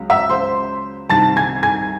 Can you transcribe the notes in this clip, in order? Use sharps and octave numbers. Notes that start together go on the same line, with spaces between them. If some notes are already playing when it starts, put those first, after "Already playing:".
Already playing: C#2 C#3 F#3
E5 E6
C5 C6
C2 C3 D#3 A5 A6
G#5 G#6
G#5 G#6